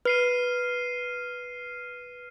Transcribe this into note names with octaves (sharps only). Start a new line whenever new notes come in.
B4 F6 C7 D#7